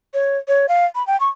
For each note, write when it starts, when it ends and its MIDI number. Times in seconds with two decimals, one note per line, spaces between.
0.14 0.37 73
0.48 0.66 73
0.69 0.85 77
0.95 1.05 83
1.07 1.19 79
1.20 1.29 85